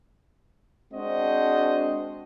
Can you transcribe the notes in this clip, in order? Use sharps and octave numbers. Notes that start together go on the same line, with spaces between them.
G#3 C4 D4 F#4 C5 D#5